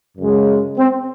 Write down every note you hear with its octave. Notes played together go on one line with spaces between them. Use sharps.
F#2 C#3 G#3
C4